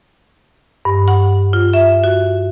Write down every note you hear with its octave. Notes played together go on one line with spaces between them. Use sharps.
G2
F#5
F4
E5
F#4